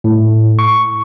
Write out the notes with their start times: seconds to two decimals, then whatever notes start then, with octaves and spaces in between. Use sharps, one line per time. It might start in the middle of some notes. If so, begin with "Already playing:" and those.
0.04 A2
0.59 C#6